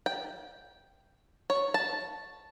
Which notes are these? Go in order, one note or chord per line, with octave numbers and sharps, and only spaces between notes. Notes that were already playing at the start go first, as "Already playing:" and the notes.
G5
C#5
A5